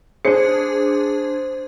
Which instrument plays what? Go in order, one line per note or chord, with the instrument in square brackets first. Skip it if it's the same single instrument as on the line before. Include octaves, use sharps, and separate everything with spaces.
[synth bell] D4 G#4 [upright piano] C5 C#7